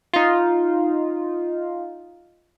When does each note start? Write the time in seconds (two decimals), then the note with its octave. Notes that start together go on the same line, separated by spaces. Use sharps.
0.14 D#4 F4